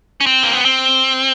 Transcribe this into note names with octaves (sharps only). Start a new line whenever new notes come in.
C#4
C4
A#3
B3
C4